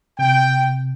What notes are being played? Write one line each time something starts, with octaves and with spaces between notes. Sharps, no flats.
C3 G5